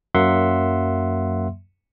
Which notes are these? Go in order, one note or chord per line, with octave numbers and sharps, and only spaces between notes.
F#2 F#3 A#3 E5 F#5 C6